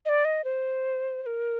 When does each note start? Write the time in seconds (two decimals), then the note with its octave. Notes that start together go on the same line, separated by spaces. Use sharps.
0.06 D#5
0.09 D5
0.25 D#5
0.44 C5
1.23 C5
1.26 A#4